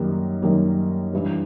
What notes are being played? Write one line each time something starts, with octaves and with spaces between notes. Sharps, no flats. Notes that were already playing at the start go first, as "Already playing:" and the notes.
Already playing: F#2 D#3 G3 A#3
F#2 D#3 G3 A#3
G2 E3 G3